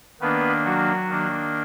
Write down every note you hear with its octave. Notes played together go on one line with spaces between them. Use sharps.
D#3 A#3 B3 D4 B4
F#3 F#4
D#3 A#3 D4